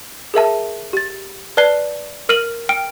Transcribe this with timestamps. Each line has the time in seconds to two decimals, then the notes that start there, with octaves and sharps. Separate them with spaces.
0.34 G#4 A#4 E5 A5
0.93 G4 A6
1.57 B4 D5 A5 F#6 C7 G7
2.29 A#4 F6 D#7 F#7
2.69 G5 F6 D7